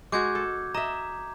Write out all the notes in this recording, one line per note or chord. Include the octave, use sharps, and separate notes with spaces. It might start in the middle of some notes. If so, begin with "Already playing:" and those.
G#3 F#4 D6 G6 G#6
A4
D#5 E5 A#5